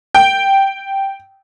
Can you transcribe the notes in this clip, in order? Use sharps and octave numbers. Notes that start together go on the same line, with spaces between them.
G5